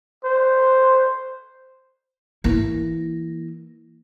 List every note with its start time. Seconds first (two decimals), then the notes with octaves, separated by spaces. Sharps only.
0.24 C5
2.44 E3 A#3 E4